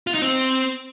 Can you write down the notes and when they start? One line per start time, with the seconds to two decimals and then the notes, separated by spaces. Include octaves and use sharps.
0.07 F4
0.14 D#4
0.22 C4